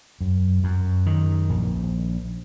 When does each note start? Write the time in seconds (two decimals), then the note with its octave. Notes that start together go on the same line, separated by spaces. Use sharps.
0.21 F#2
0.64 F#2
1.06 D#3
1.50 A#1